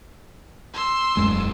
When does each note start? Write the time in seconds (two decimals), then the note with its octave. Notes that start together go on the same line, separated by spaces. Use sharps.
0.74 C6 E6
1.17 E1 F#2 G#3